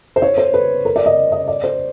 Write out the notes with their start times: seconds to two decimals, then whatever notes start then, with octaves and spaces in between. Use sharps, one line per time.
0.16 C5
0.22 C#5
0.38 C5
0.54 B4
0.85 A#4
0.96 D5
1.06 D#5
1.32 D#5
1.48 D5
1.64 C5